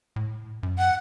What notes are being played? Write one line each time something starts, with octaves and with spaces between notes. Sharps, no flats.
A2
F#2
F#5